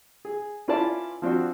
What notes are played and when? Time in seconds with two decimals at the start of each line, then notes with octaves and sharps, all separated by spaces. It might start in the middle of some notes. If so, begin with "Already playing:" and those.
0.25 G#4
0.68 C#4 E4 F4 B4 D5 A5
1.22 F3 C4 D4 F#4